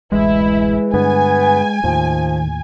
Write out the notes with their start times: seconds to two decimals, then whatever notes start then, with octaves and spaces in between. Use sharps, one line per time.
0.12 D1 A1 E3 G#3 E4
0.94 G2 D3 B3 G#5
1.84 D#2 A2 D#3 F3